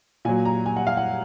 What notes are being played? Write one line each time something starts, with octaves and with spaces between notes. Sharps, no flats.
A#2 F#3 G#5
A#5
G#5
F#5
F5
F#5